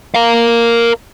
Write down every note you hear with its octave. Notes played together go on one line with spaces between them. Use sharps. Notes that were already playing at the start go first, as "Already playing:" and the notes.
A#4 F5